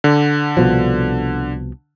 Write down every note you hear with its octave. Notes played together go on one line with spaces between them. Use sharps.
D3
C2 B2 F3